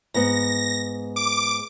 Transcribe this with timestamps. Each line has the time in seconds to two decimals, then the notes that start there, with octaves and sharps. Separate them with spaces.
0.14 G#2 B3 A#6
1.16 D6